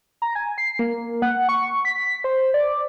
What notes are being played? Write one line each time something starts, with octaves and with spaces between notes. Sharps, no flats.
A#5
G#5
C7
A#3
F#5
C#6
B6
C5
D5